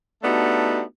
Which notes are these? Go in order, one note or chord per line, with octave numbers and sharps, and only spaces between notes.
A3 B3 D4 D#4 F#4 G4